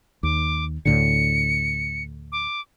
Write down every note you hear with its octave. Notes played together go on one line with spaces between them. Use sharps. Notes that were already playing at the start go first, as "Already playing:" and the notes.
D#2 D6
D2 A2 D3 C#7
D6